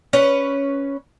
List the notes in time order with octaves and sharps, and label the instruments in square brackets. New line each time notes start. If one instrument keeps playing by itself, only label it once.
[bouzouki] C#4 B4